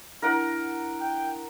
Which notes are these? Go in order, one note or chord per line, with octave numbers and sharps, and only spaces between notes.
D4 E4 A#4 F#5 D7
G5